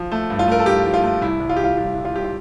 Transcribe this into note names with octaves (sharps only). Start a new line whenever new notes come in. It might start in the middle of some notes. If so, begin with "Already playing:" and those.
Already playing: F3
A3
G2
F4
A3 A#4
A4
G2 G4
F3
F4
A3
C2 E4
C2
F4
C2 G4
F4
C2 F4
C2
F4
C2 G4
F4